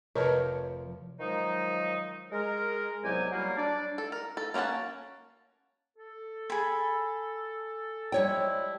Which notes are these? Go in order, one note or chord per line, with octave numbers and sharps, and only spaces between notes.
F1 F3 A#4 B4 C#5 D#5 A5 C#7
D#3 F3 F#3 G#3 D#4
G#3 A#4
C2 G#2 F#3 B3 G4 G#5
F#3 G3 A#3
D4 D5
A4
A#4
A4
A#3 C#4 F4 F#5 A5
A4
G#4 B5
F3 G3 G#3 E4 C#5 G5